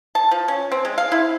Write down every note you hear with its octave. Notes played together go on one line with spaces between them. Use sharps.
A5
F3
C#4
C4
G#3
F5
E4